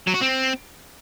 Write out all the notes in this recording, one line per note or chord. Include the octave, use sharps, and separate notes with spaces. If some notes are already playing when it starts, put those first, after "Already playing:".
F#3
F#4
C4